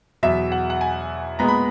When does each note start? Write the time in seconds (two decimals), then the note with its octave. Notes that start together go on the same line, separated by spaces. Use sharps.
0.23 E2 B2 F#3 E5
0.52 F#5
0.70 F#5
0.81 G#5
1.39 A#2 G#3 B3 A#5
1.48 B5